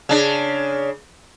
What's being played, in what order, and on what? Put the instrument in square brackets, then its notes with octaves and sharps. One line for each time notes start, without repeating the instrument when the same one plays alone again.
[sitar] C#3 D4